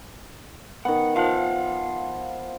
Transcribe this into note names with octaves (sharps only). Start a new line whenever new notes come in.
D#3 B3 F#5
F3 F5 F#5